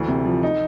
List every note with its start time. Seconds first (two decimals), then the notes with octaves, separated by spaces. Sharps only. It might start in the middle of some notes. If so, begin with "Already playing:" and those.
Already playing: D2 E3
0.08 C3
0.26 F3
0.43 D#4